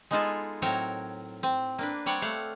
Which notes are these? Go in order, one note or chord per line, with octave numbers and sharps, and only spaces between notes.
G#3 B3 D#4 F4 G#4 A4
A2 F#3 C4 A#4 C#5
C4
A#3 D4 B4
G3 C4 C#5 D5 F#5
A3 F5 F#5